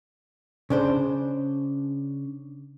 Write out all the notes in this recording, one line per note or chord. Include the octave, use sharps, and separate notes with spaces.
C#3 D4 C5